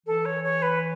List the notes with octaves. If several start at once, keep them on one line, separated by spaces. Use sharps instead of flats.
E3 A4
C#5
C#5
B4